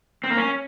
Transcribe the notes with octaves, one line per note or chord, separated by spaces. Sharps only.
C4
A#3
C#4